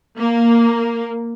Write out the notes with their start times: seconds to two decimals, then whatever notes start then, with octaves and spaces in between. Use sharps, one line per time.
0.19 A#3